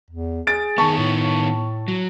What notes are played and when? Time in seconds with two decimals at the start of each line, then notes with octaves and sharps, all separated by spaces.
0.10 E2
0.47 G#4 A6 D7
0.78 D#3 B3 A5 C#6
0.98 A2
1.88 F#3